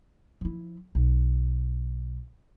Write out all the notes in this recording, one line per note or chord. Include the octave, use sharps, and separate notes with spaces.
F3 E4
B1